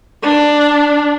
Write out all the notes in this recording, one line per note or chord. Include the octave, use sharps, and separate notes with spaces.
D4